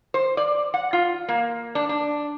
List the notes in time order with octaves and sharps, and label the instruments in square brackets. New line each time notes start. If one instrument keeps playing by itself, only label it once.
[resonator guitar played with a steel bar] C5
D5
F#5
F4
A#3
D4
D4